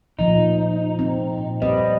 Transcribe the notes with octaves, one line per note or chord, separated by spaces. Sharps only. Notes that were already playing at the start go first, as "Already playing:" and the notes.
A#2 F3 A3 D#4
C4
A#2
G3 C4 B4 D#5